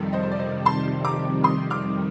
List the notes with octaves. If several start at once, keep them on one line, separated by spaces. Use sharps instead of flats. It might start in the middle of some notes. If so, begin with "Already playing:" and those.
Already playing: F2 C3 D#3 G3 A4
C5 D#5
C5
D5
C5 D#5
A5 C6
A#5 D6
C6 D#6
D6 F6